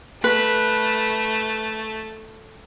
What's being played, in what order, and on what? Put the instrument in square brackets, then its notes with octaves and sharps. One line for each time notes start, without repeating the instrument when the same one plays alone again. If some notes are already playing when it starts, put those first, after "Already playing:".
[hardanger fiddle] A3 [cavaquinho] B4